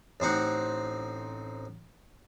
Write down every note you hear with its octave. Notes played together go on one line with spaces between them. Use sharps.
A1 C4 D#4 F#5